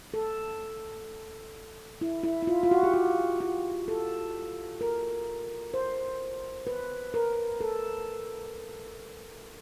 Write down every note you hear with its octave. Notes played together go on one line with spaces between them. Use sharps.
A4
E4
E4
E4
F4
F4
F#4
G4
F#4
F4
A4
A#4
C5
B4
A#4
A4